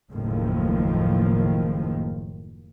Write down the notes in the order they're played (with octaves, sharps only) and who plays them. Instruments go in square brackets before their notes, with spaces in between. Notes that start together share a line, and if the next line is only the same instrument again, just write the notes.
[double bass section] F#1 D#2 A2 D#3 F3